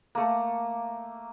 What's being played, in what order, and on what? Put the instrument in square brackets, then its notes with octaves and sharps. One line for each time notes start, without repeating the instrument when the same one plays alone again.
[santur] A3 A#3